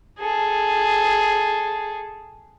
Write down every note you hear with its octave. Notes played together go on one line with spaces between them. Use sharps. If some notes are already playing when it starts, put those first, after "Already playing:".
G#4 A4